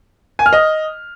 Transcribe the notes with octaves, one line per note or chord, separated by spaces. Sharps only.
G#5
F6
D#5